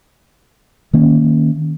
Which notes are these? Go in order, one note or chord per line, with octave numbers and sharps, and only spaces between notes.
D#3 A#3 C#4